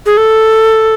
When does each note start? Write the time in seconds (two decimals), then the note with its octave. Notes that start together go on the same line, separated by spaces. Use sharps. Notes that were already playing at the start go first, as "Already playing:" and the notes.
0.06 G#4
0.17 A4